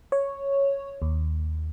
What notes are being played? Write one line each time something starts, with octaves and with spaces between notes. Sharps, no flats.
C#5
D#2